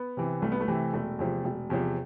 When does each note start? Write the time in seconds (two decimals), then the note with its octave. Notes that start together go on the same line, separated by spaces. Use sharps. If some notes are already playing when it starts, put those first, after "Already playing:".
Already playing: B3
0.17 C3 E3
0.42 C2 A3
0.52 B3
0.60 A3
0.68 C3 E3
0.93 E1 A3
1.19 E2 C3 F3
1.44 E1
1.70 E2 C3 F3